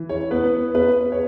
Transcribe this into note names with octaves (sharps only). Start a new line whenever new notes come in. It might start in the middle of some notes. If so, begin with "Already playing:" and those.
Already playing: E3
C#5
B3 B4
B3 B4
C#5